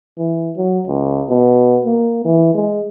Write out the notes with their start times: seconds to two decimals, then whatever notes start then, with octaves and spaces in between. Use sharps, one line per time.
0.17 E3
0.56 F#3
0.87 C#2
1.29 B2
1.85 A#3
2.25 E3
2.54 G#3